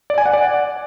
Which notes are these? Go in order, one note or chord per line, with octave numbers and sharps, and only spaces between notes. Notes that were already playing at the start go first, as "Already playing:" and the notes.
D5
G#5
F#5
D5